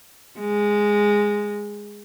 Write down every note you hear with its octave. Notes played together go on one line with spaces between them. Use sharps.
G#3